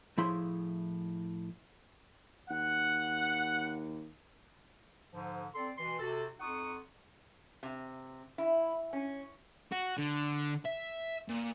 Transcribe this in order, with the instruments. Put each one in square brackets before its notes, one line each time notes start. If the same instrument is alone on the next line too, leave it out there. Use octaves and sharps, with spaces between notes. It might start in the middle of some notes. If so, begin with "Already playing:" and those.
[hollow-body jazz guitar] A2 F3 E4 G#4 C6
[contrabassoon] D#2 [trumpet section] F#5
[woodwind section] G#2 D3 F3
C4 A4 D5 C6
B2 E3 C6
C3 F#4 A4
F2 D#4 F4 F#5 C#6 D#6
[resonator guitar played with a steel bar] C3
E4
C#4
[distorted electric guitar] F#4
D3
E5
A#2